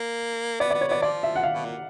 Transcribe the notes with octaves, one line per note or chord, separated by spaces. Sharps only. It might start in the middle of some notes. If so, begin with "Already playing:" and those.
Already playing: A#3
B3 D5
D5
B3
C#5
B3 D5
F3 D5
E5
F#5
F5
B2
A#2